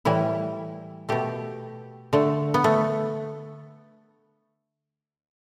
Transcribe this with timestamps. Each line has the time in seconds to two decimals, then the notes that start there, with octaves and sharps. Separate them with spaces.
0.05 A2 E3 G3 E4
1.09 B2 A3 G4
2.13 D3 A3
2.54 B3
2.64 A3